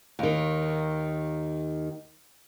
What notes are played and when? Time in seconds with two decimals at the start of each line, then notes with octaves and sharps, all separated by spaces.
0.19 D#2 D#3